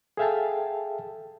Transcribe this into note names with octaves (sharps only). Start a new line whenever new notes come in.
G#4 A4 E5 F5 G5 A5